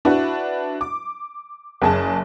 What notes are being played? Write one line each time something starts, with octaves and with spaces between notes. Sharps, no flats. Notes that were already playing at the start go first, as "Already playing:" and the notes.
D4 E4 F#4 B4
D6
F#1 G#4 A5